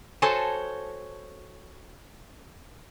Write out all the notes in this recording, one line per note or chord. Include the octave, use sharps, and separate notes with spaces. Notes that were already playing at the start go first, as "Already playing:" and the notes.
F#4 A4 C5 C#5 G#5 A5